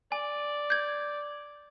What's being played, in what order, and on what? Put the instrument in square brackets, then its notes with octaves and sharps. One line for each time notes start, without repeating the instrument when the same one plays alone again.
[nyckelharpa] D5 [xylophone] G#5
[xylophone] G6 G#6